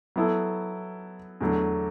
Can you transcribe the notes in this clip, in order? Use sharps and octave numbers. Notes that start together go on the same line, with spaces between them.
F#3 B3 E4 A4
E2 D3 F#3 A3